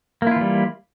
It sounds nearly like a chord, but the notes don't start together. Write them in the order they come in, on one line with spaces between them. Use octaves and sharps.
A#3 E4 F4 E3 G3